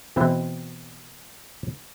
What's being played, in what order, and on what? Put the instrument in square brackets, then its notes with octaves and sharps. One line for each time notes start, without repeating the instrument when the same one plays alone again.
[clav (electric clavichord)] B2 E3 C4 B4 C5 E5